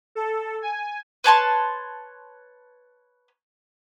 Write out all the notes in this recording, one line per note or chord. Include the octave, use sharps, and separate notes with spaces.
A4
G#5
B4 C#5 A5 C6